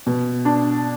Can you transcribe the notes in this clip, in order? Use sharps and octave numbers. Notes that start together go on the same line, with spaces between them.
B2
D4